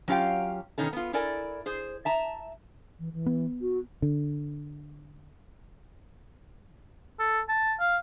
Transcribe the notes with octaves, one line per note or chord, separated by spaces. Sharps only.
F#3 C#4 F4 G4 F5 G5
B2 D#3 C#4 D#4 A4
B3 F4
E4 A4 A#4 D5 G#5
G#4 C5
E5 A5 A#5
E3
E3
B3
F#4
D3
A4
A5
F5